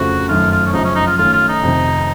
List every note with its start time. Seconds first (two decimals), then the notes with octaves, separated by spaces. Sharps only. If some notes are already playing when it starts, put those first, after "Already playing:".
Already playing: F2 C#3 F3 A3 F#4
0.29 F#2 D#3 A3 F4
0.51 F4
0.66 C#4
0.73 F#2 C#3 F3 D#4
0.84 C#4
0.95 D#4
1.06 F4
1.18 D#3 A3 C#4 F4 A4
1.33 F4
1.49 D#4
1.63 F2 C3 D#3